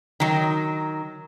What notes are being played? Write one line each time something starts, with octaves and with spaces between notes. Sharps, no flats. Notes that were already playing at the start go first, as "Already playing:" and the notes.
D#3 F#3